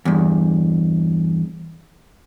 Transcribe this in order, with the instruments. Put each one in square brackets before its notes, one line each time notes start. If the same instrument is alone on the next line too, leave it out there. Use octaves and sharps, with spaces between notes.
[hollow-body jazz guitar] E2 G2